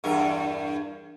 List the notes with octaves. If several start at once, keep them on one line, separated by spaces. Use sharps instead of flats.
E2 G2 A#4